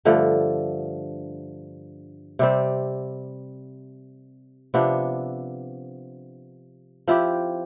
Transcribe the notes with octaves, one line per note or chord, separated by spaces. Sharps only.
G2 D3 F3 A3
C3 G3 C4
C3 F3 B3 D4
F3 C4 E4 G4